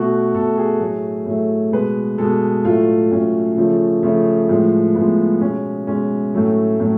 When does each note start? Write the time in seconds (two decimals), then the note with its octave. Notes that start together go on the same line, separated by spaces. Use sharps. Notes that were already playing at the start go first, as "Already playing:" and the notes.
Already playing: B2 A3 F#4
0.35 B2 A3 A4
0.58 G#4
0.80 A2 F#3 A3
1.26 A2 F#3 A3
1.72 B2 G#3 B4
2.18 B2 G#3 A4
2.65 A2 F#3 A3 F4
3.12 A2 F#3 A3 C#4
3.57 C#3 F3 A3
4.03 C#3 F3 A3
4.49 A2 F3 G#3
4.95 A2 F3 G#3 B3
5.41 B2 G#3 C#4
5.87 B2 G#3 C#4
6.34 A2 F#3 A3
6.80 A2 F#3